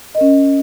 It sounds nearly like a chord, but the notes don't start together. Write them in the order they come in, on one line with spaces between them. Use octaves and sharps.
D#5 A#4 C#4